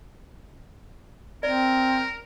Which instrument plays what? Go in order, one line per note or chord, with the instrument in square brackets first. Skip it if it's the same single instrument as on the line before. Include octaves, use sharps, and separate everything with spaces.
[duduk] C4 [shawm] A#4 [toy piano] D5